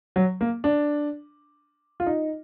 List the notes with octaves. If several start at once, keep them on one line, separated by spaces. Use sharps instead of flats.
F#3
A#3
D4
F4
D#4